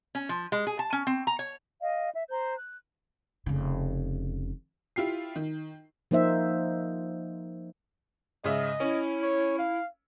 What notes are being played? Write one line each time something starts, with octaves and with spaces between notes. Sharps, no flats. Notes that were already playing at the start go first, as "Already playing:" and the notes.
C#4
F3
G#3
G#4
A5
C#4
C4
A#5
C#5
D#5 F5
E5
C5 A#5 G6
F#6
F1 C#3
E4 F4 G4 C7
D#3
F3 A#3 D#4 C5 E5
G#2 C#3 D#5 E5
C#4 E4
C#5
F5